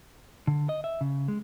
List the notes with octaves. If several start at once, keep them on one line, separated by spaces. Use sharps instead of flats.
D3
D#5
E5
C#3
G#3